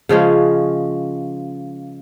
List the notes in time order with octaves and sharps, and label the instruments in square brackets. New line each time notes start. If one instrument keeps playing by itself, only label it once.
[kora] C#3 F3 G#3 C#4